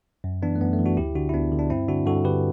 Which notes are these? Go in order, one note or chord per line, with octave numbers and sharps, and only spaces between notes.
F#2
E3 B3 D4
A3
F#2 B3
A3
E3
D4 F#4
D2 E4 G4
D3 D4 F#4
E4
D2 B3 D4
D3
D4
G2 C4 E4
D3 D4 F#4
G2 F#4 A4
D3 G4 B4